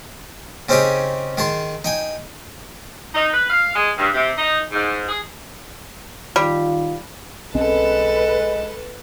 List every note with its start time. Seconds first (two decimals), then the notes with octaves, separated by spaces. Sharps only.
0.69 C#3 C4 C#4 D#4 G4 G#4
1.38 D#3 G#4 A5 C6
1.84 D#4 G5 G#5
3.15 D#4
3.33 B4
3.50 F5
3.75 G#3
3.98 G2
4.14 C3
4.38 D#4
4.72 G#2
5.08 G#4
6.36 D#3 G3 F4
7.55 B1 G#3 C4 C#4 A4 B4 A5